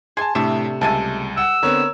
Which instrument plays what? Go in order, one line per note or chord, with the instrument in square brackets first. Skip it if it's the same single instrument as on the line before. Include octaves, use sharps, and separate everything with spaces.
[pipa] G#4 G#5 [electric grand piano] A5 C6
[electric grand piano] A2 E5 E7 [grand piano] C3 A3 [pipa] D4
[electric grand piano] C#2 G3 D#7 [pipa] G#3 E5 A5
[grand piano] F#5 [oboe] E6
[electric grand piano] D3 B3 C4 [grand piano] A#4 C#5 A#5